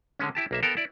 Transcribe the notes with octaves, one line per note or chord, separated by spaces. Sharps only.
D3 G#3 C#4
E4 G4 A5
B1 A#3 E5
B3 A4 A#4 F5 G5
E4 D5